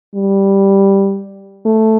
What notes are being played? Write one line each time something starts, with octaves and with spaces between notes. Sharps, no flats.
G3
A3